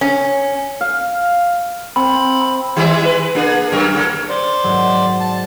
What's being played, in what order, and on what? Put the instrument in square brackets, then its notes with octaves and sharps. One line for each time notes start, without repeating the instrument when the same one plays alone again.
[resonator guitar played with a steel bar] C#4
[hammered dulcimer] F5
[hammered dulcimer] C4 [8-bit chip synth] B5
[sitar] D#3 G3 G#3
B4
A#3 D4 G#4
F#2 A#4
C#3 A#3 A4
[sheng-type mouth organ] C5 D5
[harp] G#2 F#3
[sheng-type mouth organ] A5